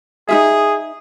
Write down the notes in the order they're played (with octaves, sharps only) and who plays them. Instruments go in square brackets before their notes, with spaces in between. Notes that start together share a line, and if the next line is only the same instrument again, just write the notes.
[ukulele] D#4 F4 E5 [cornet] G#4